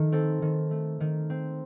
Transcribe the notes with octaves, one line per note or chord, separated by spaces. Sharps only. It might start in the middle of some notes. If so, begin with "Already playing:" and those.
Already playing: D#3 A3
C4 A4
D#3
A3
D#3
C4